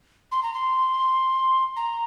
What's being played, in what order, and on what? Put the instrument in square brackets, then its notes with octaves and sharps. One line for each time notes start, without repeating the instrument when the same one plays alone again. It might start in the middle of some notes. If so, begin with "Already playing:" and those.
[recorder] C6
A#5
C6
A#5